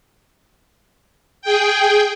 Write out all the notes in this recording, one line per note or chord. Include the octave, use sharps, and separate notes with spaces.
G#4 G5